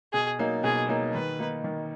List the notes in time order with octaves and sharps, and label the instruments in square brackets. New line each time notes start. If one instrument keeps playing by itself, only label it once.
[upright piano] B2 [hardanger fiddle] G#4
[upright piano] F#3 A#3 D#4
[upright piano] B2 [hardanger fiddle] G#4
[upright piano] F#3 A#3 D#4
[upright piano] D#3 [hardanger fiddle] B4
[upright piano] A#3 D#4
D#3